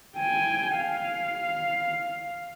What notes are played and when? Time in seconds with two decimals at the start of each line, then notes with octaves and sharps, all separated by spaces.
0.17 G5 G#5
0.78 F5